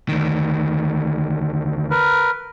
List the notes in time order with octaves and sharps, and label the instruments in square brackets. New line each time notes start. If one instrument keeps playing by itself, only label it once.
[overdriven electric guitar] D2 D#3
[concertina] A#4 B4